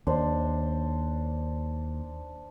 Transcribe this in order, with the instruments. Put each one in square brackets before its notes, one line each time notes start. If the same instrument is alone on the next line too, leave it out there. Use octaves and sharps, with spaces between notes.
[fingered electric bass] D#2 [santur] D4 C5